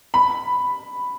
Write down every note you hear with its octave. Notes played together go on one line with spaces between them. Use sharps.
B5